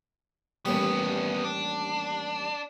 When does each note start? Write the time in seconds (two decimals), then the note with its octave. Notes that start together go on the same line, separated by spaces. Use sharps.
0.66 A1 D#2 G3 B3 D4
1.44 D4